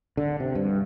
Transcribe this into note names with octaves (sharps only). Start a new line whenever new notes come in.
D3
C3
G2